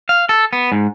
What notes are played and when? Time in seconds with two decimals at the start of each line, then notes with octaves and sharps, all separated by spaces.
0.09 F5
0.29 A4
0.53 B3
0.72 G#2